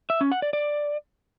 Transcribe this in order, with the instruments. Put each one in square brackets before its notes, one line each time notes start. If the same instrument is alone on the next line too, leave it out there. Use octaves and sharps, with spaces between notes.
[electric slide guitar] E5
C#4
F#5
D5
D5